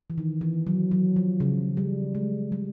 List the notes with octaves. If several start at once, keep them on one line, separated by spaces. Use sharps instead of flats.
E3
D#3
E3
F#3
F#3
F3
C#3
G3
G#3
G3